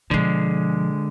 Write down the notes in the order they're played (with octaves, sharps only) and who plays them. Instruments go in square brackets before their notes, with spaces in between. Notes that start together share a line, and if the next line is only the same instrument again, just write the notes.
[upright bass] B2 F3 [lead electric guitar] D3 G#3